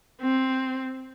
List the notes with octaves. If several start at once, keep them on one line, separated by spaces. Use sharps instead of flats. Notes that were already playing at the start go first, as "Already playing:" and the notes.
C4